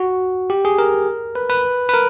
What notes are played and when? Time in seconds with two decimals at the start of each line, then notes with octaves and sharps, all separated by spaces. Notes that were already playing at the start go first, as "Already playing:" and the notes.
Already playing: F#4
0.50 G4
0.65 G#4
0.78 A#4
1.35 B4
1.50 B4
1.89 B4
1.94 A#4